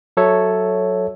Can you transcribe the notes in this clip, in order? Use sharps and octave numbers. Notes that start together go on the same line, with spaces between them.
F#3 A4 C#5 E5